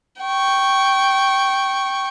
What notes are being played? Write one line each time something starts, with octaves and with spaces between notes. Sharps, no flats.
G5 C#6